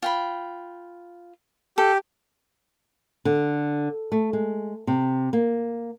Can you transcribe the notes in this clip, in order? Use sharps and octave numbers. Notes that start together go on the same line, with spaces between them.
F4 G5 B5
G4 A4
D3
A3
G#3
C3
A#3